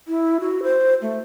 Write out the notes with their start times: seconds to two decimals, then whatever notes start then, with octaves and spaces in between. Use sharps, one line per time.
0.08 E4
0.40 F#4
0.63 C5
1.02 A3